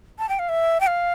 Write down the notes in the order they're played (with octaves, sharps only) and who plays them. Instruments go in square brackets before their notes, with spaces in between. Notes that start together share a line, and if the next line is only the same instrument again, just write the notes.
[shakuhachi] A5
G5
F5
E5
G5
F5